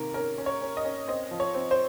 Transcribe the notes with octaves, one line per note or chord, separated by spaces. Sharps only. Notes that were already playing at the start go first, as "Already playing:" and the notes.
Already playing: C3 D#3 A#3 A#4
C#4 A#4
C#4
C#5
C#4
D#5
C#4
C4 D#5
F3
C#5
C4
C5